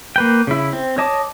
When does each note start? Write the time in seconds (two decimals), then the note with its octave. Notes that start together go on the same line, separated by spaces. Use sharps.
0.16 A#3 B4 G5
0.47 C#3 E4
0.73 C4
0.98 C#5 D#5 A5 D6